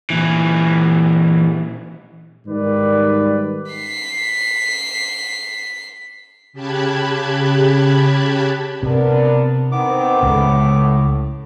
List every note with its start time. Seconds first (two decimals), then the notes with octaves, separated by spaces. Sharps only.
0.10 A#2 E3
2.46 G#2 D#3 G3 B4 D5
3.72 B6 C7
6.53 C#3 G4 A5 B5 F#6 G#6
8.83 C3 B3 D4 A#4
9.72 D#3 B3 C4 D6
10.23 C#2 A2 C#3